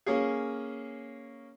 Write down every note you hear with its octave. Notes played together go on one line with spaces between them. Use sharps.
A#3 C#4 G#4